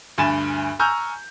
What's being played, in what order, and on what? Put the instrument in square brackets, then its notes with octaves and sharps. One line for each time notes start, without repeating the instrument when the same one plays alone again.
[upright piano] D2 G2 G#5 B5 A6 E7
G#5 A#5 C#6 E6 F6 G6